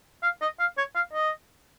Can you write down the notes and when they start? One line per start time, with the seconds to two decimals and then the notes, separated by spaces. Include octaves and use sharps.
0.23 F5
0.41 D#5
0.60 F5
0.77 C#5
0.95 F5
1.13 D#5